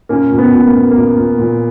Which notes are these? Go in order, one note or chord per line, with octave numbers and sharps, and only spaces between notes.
A#2 A#3 C#4
A#2
B3
A#2
A#3
A#2
A#2 A#3
A#2
A#2